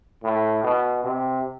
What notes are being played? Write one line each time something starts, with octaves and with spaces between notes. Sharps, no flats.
A2
B2
C3